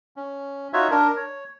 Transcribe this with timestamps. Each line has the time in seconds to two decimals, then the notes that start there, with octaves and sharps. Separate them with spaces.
0.16 C#4
0.73 D#4 F4 F#4 C#5 E5
0.91 D4 A#4
1.17 C#5